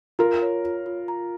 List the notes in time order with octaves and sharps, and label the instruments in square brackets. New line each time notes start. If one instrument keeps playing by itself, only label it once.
[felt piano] F4 A#4 [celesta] A#5
[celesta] C#5
F4
F4
A#5